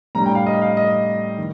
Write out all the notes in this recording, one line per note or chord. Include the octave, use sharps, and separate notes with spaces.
A2 G3 D4 A#5
G5
F5
D#5
F5
D#5
D#3